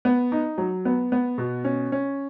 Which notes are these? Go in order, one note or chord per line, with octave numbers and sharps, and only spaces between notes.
B3
D#4
F#3
B3
B3
B2
C#4
C#4